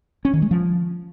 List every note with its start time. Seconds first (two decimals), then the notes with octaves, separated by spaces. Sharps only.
0.25 C#4
0.33 D#3
0.42 G#3
0.51 F3